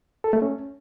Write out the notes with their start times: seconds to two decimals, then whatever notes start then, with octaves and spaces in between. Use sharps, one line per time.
0.24 A4
0.33 A3
0.42 C#4